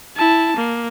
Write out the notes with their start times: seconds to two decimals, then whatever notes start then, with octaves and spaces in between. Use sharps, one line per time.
0.16 E4 A5
0.57 A#3